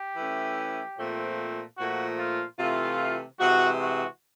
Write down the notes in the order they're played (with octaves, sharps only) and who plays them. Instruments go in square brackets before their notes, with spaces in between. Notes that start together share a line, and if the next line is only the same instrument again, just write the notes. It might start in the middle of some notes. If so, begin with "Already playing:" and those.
Already playing: [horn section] G4
E3 A3 C#4
A#2 F3 A3 C4
A#2 F3 A3 F#4
F4
C3 E3 A3 F4
C3 E3 G#3 F#4
F#4